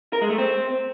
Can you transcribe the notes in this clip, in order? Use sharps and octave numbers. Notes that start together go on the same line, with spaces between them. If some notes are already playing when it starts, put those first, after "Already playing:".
A#4
G#3
A3
C4